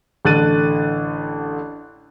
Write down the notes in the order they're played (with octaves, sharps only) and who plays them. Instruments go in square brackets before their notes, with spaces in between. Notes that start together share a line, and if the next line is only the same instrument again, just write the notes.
[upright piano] A1 D3 F#6 A6 D#7